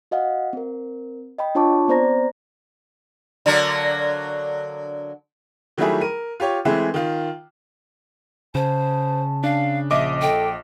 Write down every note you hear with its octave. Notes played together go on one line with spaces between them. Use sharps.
F#4 D#5 F5 F#5
C4 A#4
D#5 G5 B5
D4 F4 C#5 A5 C#6 D6
B3 C4 C5 D5 A#5 A#6
D3 F#3 A#3
D#3 F#3 G3 A3 E4 G#4
A#4 D#7
F4 G4 C#5
E3 G#3 A3 C4 E4
D#3 F4
C#3 C5 A5
D4 F5
A#1 D#5 E5 D6
A4 G5